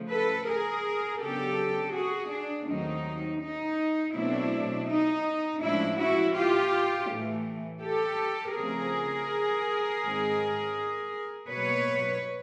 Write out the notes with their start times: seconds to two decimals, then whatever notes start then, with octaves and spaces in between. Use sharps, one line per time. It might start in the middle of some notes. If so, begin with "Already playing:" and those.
Already playing: C#3 F3 A3
0.11 A4 B4
0.47 G#4 A#4
1.21 C#3 F#3 B3 D4 G4 A4
1.94 F#4 G#4
2.31 D4
2.68 D#2 D#3 F#3 A3 C4 D#4
3.42 D#4
4.15 B2 F#3 A3 C4 D4 E4
4.88 D#4
5.62 A2 F3 G#3 C#4 D4 E4
5.98 E4 F#4
6.36 F4 G4
7.09 A2 E3 A3
7.82 G4 A4
8.55 C#3 F3 A3 C4 G#4 A#4
10.03 G#2 D#3 G#3 C4
11.49 B2 F#3 A#3 B4 C#5